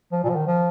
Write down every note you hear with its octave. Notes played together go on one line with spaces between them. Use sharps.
F3
A#2
F3
D#3
F3